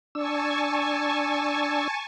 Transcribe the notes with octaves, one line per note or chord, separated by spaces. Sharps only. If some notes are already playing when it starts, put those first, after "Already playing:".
D4 G#5 A5 C#6 E6